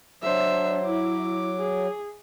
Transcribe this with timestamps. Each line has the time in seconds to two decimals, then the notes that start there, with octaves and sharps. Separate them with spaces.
0.23 F#3 D4 C5 E5
0.85 E4 D6
1.58 G#4